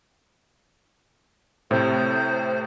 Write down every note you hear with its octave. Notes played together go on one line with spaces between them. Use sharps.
A2 C3 C5